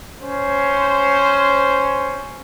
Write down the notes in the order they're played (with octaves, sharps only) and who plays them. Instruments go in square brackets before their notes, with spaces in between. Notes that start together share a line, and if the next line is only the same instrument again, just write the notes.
[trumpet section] C#4 C5